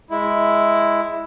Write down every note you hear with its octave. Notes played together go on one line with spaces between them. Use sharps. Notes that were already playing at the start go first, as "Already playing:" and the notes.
G#3 E4